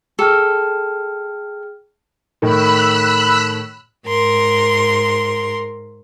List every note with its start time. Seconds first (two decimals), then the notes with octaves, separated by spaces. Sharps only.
0.19 G#4 A4 G5 F6
2.42 A2 D#3 B5 E6 F#6
4.08 G#2 A#4 C6